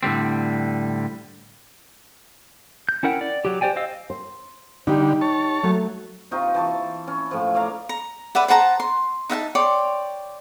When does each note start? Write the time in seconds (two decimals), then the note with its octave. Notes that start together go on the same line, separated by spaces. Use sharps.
0.03 A2 D3 G3 C4
2.89 G6
3.03 C#4 E4 A#4 F#5 G5
3.21 D5
3.45 F#3 G4
3.61 G4 C5 D5 G5 G#5
3.76 C5 D#5 F5 E6
4.10 C5
4.87 D3 G3 D#4 G4
5.21 C#5 A5
5.63 F#3 A3
6.31 C3 D#4 F4 C#6
6.54 E3 A5 C#6
7.08 C#4
7.31 A2 F3
7.54 C#5 D5 F5 A#5
7.89 A#5
8.35 B4 D5 E5 F#5
8.48 C5 F#5 A5 A#5
8.80 C6
9.30 D#4 E5 F#5 A5
9.55 C#5 D5 G5 C6